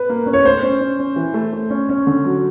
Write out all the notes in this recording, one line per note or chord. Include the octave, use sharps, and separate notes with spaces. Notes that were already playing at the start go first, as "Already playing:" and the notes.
Already playing: B4
A#3
C#4
C#5
A3 C5
C#4
C#4
C#4
E3
A3
A3
C#4
C#4
D3
F#3